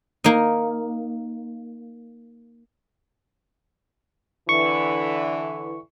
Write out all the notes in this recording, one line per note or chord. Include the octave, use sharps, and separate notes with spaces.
A#3 D#4
D3 E3 C#6